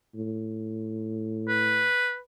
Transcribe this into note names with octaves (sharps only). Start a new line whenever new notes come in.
A2
B4